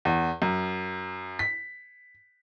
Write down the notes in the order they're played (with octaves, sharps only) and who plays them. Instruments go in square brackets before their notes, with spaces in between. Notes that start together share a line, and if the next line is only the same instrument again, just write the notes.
[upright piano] E2
F#2
B6